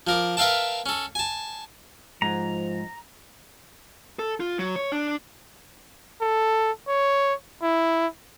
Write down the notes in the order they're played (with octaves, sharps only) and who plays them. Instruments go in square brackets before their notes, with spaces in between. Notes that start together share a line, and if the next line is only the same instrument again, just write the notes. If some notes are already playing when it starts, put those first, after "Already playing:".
[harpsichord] F3 A#4 D6
A#4 B4 E5 F5 G5 A5
C#4 A4
G#5 A5
[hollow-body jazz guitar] G#2 [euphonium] F3 [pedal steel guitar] A#5
[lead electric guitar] A4
F4
F#3
C#5
D4
[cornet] A4
C#5
E4